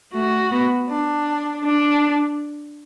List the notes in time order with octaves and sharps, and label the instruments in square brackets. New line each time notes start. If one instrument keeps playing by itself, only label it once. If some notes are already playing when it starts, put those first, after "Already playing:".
[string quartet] A3 [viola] F#4
[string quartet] B3
D4
[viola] D4